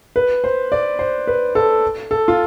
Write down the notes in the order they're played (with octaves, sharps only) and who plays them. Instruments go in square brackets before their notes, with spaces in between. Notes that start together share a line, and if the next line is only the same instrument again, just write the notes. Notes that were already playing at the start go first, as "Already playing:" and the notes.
[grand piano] B4
C5
D5
C5
B4
A4
A4
F4